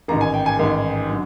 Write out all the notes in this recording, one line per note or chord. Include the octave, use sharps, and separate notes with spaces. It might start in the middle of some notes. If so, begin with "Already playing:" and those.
A1 G#2 D#3 A#5
G#5
G5
G#5
A1 G#2 D#3
D3 F#3